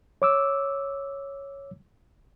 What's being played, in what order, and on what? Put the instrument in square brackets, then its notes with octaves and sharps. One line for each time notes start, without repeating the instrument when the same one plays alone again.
[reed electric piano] C#5 D6 E6